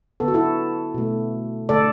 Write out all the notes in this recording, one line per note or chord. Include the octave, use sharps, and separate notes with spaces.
D3 B3 A4
F#4
E4 A4
B2 A3
D3 A3 A4 D5